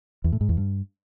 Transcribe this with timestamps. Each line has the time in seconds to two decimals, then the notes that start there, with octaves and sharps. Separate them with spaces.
0.24 E2
0.32 A2
0.41 G#2
0.49 E2
0.57 G2